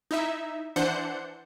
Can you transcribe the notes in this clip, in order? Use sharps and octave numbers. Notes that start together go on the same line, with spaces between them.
D#4 E4 E5
E3 D4 C5 F#5 G6 C#7